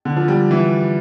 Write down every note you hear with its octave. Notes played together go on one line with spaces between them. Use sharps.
D3
F3
G3
E3